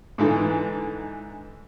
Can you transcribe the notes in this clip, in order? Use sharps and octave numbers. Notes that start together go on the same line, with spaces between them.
G#2 D3 E3